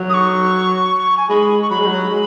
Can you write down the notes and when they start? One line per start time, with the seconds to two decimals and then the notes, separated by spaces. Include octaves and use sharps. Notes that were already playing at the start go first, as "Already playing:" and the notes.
Already playing: F#3
0.10 D#6
0.14 C#6
1.18 G#5
1.29 G#3 B5
1.62 C#6
1.70 F#3 B5
1.78 G#3
1.86 F#3
2.10 G#3